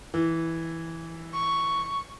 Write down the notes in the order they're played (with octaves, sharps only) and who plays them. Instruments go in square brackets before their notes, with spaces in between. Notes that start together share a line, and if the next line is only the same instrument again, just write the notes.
[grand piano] E3
[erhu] C#6